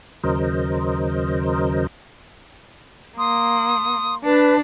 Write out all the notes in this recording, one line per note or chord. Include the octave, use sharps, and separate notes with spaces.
D#2 C#3 F#3 A#4 C5 D#5
A#3 C6 D#6
D4 B4 A5